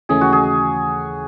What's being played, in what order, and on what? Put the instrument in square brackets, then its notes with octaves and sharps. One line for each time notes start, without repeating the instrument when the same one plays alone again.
[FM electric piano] D#2 C#3 E3 A3 C#4 [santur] G#4
[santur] F#4
G#4